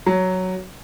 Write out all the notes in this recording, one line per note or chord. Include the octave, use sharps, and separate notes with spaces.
F#3